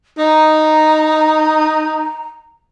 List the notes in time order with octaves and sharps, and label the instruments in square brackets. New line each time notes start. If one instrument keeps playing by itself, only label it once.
[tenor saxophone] D#4 [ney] A#5